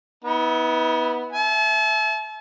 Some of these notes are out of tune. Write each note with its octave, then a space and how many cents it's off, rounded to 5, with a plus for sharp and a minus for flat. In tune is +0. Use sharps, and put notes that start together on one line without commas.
B3 +0 E4 -45
E5 +0 A5 -40